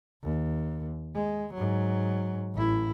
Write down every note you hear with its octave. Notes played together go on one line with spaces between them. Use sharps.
D#2
G#3
G#2 F#3
A1 E4